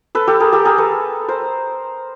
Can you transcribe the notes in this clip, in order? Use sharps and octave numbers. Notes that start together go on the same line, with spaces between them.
A4 B4
G4 A4
G#4 A#4
G4 A4
G#4 A#4
A4 B4
A#4 C5